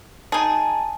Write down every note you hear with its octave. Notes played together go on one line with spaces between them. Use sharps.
D#4 G#4 G#5 A5